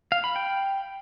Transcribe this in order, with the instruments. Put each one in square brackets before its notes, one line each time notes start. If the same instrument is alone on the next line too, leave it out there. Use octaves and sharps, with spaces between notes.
[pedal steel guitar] F5
B5
G5